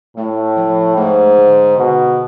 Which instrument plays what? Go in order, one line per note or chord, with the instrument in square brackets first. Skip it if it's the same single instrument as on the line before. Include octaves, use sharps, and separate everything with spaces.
[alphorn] A2 [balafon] A3
[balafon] F3
[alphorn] G#2 [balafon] A3
[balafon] D3
[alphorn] B2 [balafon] D3